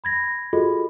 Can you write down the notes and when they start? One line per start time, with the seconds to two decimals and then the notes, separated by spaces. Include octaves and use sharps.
0.04 B5 G#6 A#6
0.53 F4 F#4 G#4 A4 D#5 B5